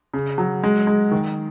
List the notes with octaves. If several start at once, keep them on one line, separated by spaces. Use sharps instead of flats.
C#3
F#3
G#3
G#3
D#3